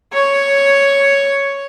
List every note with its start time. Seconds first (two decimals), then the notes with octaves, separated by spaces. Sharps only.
0.13 C#5